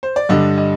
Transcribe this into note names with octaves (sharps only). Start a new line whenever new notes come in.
C5
D5
G2 D3 G3 D4 D#5
D#5